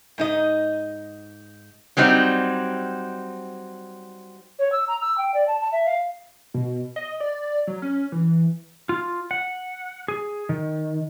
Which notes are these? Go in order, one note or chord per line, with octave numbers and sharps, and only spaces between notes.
G#2 D#4 D#5
F#3 G3 C4 D#4
C#5
E6
A#5
E6
G5
D5
A5
A5
E5
F5
B2
D#5
D5
F#3
C#4
E3
F4
F#5
G#4
D#3